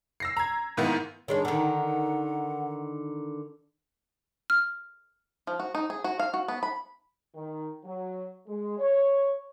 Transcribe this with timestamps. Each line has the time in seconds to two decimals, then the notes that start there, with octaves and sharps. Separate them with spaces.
0.20 E6 A#6 C7
0.37 A#5 G#6
0.77 G#2 D#3 A#3 B3 E4
1.28 D#3 G#3 D4 C#5
1.45 D3 D#3 F#5
4.50 F6
5.47 F3
5.60 F#4
5.75 D#4
5.90 G#4
6.04 F#4
6.20 F5
6.34 F#4
6.48 B3
6.63 B5
7.34 D#3
7.84 F#3
8.46 G#3
8.79 C#5